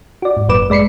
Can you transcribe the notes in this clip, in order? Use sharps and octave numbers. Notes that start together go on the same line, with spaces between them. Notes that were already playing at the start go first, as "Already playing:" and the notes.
F#4 D5
G#2
G1 F#2 A#2 B4 D6 E7
G#3 D5 B5 C7 C#7